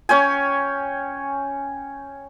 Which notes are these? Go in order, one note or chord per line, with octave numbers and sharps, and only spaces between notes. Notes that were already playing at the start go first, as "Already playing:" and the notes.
C#4 C#5 G5 G#5